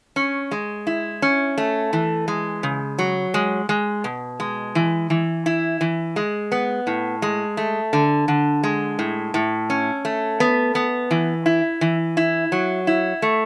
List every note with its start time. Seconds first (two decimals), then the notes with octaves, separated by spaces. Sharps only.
0.16 C#4
0.51 G#3
0.87 E4
1.22 C#4
1.58 A3
1.93 E3
2.28 G#3
2.63 C#3
2.99 F#3
3.34 G#3
3.69 G#3
4.04 B2
4.40 G#3
4.75 E3
5.10 E3
5.46 E4
5.81 E3
6.16 G#3
6.52 B3
6.87 A2
7.22 G#3
7.57 A3
7.93 D3
8.28 D3
8.63 G#3
8.99 A2
9.34 A2
9.70 C#4
10.05 A3
10.40 B3
10.75 B3
11.11 E3
11.46 E4
11.81 E3
12.17 E4
12.52 F#3
12.87 E4
13.22 A3